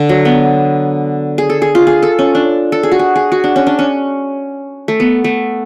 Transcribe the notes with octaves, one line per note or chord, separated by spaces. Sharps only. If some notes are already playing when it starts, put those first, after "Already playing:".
Already playing: D3
F#3
B3
G#4
A4
G#4
F4
G#4
A4
C#4
D4
A4
G#4
F#4
G#4
G#4
F#4
D4
C#4
D4
C#4
A3
B3
A3